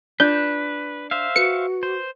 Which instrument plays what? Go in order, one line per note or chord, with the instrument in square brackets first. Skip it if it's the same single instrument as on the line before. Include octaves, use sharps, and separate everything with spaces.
[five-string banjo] D4 F4 [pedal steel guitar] B4 [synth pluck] G6
[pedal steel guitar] C5 E5 F5
[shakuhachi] F#4 [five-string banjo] B4 [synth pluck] C#7
[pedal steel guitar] C5